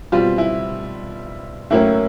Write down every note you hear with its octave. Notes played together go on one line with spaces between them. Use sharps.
B2 G3 C4 F4
E4
A2 F#3 A#3 C#4 E4